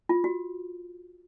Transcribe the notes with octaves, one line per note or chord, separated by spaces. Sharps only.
F4
F#4